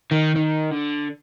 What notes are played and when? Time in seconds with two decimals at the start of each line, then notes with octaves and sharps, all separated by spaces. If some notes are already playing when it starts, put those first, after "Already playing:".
0.12 D#3
0.36 D#3
0.71 D3